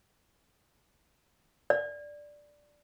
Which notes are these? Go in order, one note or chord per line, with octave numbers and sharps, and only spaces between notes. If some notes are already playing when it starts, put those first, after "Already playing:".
D5